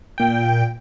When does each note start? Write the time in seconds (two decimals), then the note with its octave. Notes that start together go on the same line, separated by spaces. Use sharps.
0.18 A#2 G5